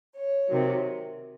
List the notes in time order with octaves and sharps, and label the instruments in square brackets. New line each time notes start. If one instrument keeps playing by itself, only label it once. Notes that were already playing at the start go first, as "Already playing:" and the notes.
[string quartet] C#5
C3 D#3 F#3